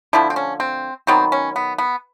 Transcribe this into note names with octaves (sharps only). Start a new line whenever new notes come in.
D3 F3 A3 E4
C4
C#4
C4
D#3 F#3 B3 C4
C#4
B3
B3